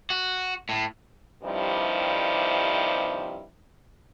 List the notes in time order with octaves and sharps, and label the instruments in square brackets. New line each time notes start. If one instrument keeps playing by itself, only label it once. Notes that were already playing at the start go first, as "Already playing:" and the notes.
[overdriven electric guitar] F#4
A2
[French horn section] G2 C3 D#3 F3 G3 E4